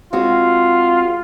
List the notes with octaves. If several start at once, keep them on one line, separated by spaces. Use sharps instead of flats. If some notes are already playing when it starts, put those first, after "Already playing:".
G#3 C4 F4 F#4